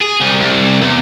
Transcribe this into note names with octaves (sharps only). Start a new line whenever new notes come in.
G#4
C2
C2
E2